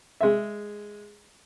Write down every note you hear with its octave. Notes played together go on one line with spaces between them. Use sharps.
G#3 E5